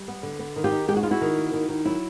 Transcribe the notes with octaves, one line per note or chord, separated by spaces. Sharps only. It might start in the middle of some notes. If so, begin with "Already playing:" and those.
Already playing: G3
B3
D3
B3
D#3
F4 G4
D#4
G#3 G4
F#4
B3 F4
E4 F#4
D#3
A#3
D#3
D#3
F#3 E4